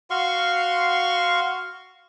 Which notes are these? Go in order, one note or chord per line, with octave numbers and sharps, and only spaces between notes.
F#4 F5 C6 C#6